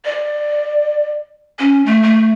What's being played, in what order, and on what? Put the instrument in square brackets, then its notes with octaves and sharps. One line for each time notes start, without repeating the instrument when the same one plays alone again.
[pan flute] D5
C#4
A3
A3